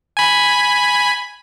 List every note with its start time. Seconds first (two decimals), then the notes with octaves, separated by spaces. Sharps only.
0.17 G#5 B5